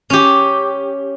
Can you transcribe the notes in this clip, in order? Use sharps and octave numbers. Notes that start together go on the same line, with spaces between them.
C#4 G4